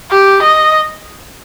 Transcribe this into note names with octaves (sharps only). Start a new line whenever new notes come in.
G4
D#5